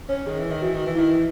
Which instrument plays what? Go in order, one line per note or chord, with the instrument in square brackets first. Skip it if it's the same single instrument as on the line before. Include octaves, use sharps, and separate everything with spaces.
[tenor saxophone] C#4 [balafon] C#5
[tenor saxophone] D#3 [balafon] G#4
[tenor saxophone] E3
D#3
[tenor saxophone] E3 [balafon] F#4
[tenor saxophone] D#3
E3
[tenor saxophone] D#3 [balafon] E4
[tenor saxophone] E3